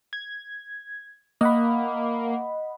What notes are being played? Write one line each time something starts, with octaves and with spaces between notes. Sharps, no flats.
G#6
A#3 D#5 F#5 B5